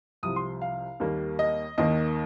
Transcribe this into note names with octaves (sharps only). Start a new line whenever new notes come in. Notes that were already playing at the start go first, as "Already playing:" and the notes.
C2 C3 F3 D#6
C6
F5
D#2 D#3 G3 A#3
D#5
D#2 D#3 A#3 D#5